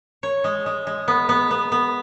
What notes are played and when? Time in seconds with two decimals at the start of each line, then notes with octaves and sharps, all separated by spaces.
0.23 C#5
0.44 G#3
0.66 G#3
0.87 G#3
1.08 B3
1.29 B3
1.51 B3
1.72 B3